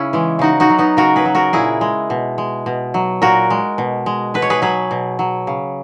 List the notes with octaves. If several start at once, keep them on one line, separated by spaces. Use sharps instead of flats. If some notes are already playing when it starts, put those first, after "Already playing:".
Already playing: C#3 C#4 E4
E3 G#3
C#3 D#4 F#4
D#4 F#4
F#3
B3 D#4
C#3 F#4 A#4
G#4 B4
F#3
F#4 A#4
A#2 E4 G#4
G#3
B2
G#3
B2
F#3
A#2 F#4 A#4
G#3
B2
G#3
B2 B4
C#5
G#4 B4
F#3 G#4 B4
B2
F#3
C#3